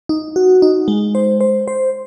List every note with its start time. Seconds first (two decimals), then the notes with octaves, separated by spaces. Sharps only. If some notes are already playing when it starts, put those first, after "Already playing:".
0.09 D#4
0.36 F#4
0.62 D#4
0.88 G#3
1.15 C5
1.41 C5
1.68 C5